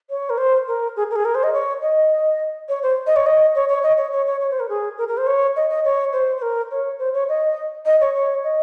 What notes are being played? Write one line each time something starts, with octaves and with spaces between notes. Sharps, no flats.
C#5
A#4
C5
A#4
G#4
A#4
G#4
A#4
C5
D#5
C#5
D#5
C#5
C5
D#5
C#5
D#5
C#5
C#5
D#5
C#5
C#5
C#5
C#5
C5
A#4
G#4
A#4
A#4
C5
C#5
D#5
D#5
C#5
C5
C5
A#4
C#5
C5
C#5
D#5
D#5
C#5
C#5
D#5